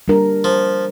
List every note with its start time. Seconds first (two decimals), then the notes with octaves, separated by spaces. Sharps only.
0.08 G3 D4 A#4
0.44 F3